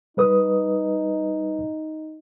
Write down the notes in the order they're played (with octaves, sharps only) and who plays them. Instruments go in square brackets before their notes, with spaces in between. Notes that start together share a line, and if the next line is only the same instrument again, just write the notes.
[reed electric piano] G3 B4 D#6 [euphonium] D#4